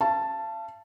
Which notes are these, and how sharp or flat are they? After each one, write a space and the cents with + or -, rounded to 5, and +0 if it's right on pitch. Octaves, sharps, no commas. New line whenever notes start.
F5 -45 A5 +0